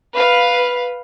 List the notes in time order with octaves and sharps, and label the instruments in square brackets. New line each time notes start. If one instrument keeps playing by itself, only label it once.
[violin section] B4 F5